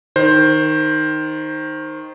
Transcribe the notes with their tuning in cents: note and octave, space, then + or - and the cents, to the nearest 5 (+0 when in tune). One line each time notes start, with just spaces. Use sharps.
D#3 +0 C5 +10